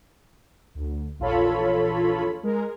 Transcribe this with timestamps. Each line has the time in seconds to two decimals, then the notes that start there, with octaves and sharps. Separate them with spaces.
0.75 D2
1.19 A#1 E2 F4 A4 C#5 B5
2.43 G#3 A#4